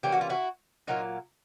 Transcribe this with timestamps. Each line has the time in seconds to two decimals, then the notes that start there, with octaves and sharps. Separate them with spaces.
0.03 E3 G3 A#3 C#4 G4
0.12 F#4
0.21 F4
0.29 E4 F#4
0.87 A#2 F#3 A#3 D#4 F4